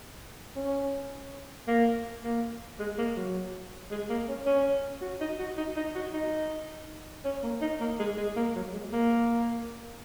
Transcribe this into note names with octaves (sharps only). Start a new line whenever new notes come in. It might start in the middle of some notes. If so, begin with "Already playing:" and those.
C#4
A#3
A#3
G#3
A#3
F#3
G#3
A#3
C#4
C#4
F#4
D#4
F#4
D#4
D#4
F#4
D#4
C#4
A#3
D#4
A#3
G#3
G#3
A#3
F#3
G#3
A#3